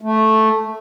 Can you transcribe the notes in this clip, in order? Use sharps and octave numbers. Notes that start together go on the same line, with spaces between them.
A3